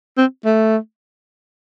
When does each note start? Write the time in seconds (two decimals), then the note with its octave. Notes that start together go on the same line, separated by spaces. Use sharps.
0.17 C4
0.45 A3